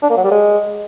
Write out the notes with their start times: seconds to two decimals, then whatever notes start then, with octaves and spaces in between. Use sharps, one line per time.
0.03 D4
0.10 A#3
0.17 F#3
0.24 G3
0.32 G#3